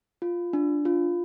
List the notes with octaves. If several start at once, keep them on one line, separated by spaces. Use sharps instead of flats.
F4
D4
F4